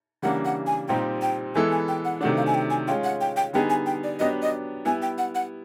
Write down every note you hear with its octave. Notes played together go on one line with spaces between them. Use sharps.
C#3 E3 G3 A#3 D4 F#5
F#5
G#5
A#2 G3 C4 D#4 G4 G5
G5
E3 G#3 B3 E4 A4 G#5
G#5
G5
F#5
C3 D#3 F#3 A3 D4 F#5
F5
G#5
G5
G#5
G#3 C#4 F4 G5
F#5
G5
G5
D3 G3 B3 D#4 G#4 G5
G#5
G5
D5
F#3 B3 D4 G4 D#5
D#5
G3 B3 E4 G#5
G5
F#5
F#5